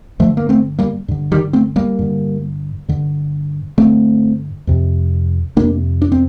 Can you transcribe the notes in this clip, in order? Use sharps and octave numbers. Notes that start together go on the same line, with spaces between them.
G2 D3 F3 A3
A#3
A3 C4
G3 A#3
G2 D3
D#3 G3
A3 C4
G3 A#3
G2 D3
G2 D3
G2 D3 A3 C4
F2 C3
F2 C3 A#3 D4
D4
C4